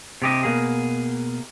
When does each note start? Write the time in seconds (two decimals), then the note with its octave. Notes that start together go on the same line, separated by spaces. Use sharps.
0.22 C3 G4 D#5
0.43 B2 A#3 G#4